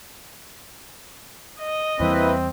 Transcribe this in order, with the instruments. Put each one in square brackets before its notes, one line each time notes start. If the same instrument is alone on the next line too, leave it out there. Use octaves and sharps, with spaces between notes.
[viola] D#5
[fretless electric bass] E2 E3 G3 [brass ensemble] A#3 E4 B4 [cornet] C4